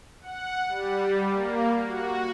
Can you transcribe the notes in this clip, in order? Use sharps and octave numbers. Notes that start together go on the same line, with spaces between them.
F#5
G3
A#3
F#4